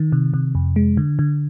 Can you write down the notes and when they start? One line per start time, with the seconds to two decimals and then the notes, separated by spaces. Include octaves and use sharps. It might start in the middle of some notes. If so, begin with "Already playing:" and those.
Already playing: D#3
0.12 C3
0.34 C3
0.55 F2
0.76 G#3
0.97 D3
1.19 D3